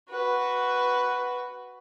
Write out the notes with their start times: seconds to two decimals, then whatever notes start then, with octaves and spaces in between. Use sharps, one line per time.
0.10 F#4 B4